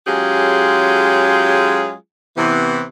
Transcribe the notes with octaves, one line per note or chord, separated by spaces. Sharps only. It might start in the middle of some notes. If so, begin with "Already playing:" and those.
F#3 G#3 C#4 F4 G4 G#4
C3 E3 B3